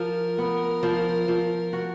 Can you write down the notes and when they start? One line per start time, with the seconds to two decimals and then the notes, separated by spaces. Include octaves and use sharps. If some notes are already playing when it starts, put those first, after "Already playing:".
Already playing: F3 A#4
0.38 B3
0.83 F3
1.28 F3
1.73 F#4